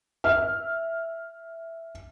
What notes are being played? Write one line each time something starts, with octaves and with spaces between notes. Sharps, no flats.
E5 F6